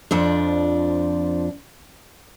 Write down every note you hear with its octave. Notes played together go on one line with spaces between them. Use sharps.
F2 F3 D4